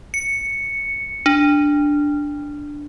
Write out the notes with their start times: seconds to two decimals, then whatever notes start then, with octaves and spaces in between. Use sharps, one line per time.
0.14 C#7
1.26 D4